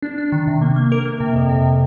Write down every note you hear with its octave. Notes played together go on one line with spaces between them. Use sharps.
D4
D4
D#3
C3
A#3
A#3
A#4
A#3
C3
F2
C3